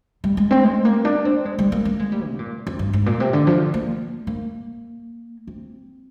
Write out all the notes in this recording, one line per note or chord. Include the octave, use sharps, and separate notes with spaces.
G3
G#3
C4
G#3
A#3
D4
C4
G#3
G3
A#3
A#3
G#3
G3
C3
A#2
F2
G2
G#2
A#2
C3
D3
F3
A#3
A#3
C4